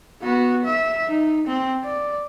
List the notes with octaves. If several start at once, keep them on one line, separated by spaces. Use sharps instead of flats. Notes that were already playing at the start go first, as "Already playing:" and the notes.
B3 F#4
E5
D#4
C4
D5